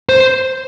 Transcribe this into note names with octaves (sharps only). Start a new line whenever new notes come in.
C5